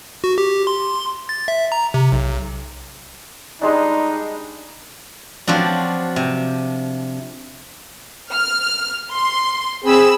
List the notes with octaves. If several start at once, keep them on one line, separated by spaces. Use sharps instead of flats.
F#4
G4
C6
A6
E5
A#5
C3
B1
G3 G#3 D4 D#4
F3 F#3 C4 D4
C3
F6
C6
C4 G#4 B5 E6